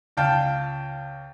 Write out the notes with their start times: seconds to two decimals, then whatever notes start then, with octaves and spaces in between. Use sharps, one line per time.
0.17 C#2 F5 G5 A5